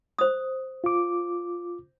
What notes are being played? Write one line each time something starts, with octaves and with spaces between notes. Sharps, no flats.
C5 D#6
F4 D6